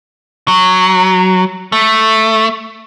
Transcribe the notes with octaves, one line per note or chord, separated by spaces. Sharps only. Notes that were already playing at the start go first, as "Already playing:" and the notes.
F#3
A3